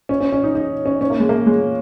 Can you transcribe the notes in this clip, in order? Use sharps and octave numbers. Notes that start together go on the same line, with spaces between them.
C#4
C#4
C#4
D#4
D#4
C#4
C#4
A#3
G#3
A#3
G#3